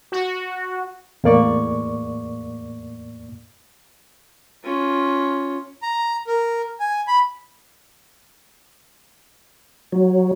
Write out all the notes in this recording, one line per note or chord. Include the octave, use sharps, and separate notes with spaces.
F#4
E2 A2 A#3 D5 C#6
C#4 F4
A#5
A#4
G#5
B5
F#3